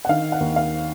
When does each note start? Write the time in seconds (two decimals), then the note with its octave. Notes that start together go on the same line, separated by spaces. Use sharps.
0.05 F#5
0.09 D#3 F5
0.32 F#5
0.40 D#2
0.56 F5